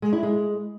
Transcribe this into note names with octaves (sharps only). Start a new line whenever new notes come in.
G#3
E4
G#3